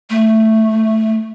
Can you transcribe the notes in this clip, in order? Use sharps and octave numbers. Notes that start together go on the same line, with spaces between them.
A3